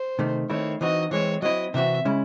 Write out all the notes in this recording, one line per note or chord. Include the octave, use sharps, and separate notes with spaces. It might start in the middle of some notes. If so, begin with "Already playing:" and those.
Already playing: C5
C3 D#3 A3
D#3 A3 C4 E4 C#5
E3 C4 D#4 F#4 D#5
E3 G#3 C4 C#5
F#3 C4 E4 D#5
C3 E3 C4 F#4 E5
C#3 G#3 C#4 E4